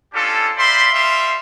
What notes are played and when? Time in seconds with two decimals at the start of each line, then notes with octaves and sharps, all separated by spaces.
0.14 C#4 D4 F4 G4 A4
0.56 C5 D5 E5 F5 B5 C6
0.93 G3 E5 F5 C6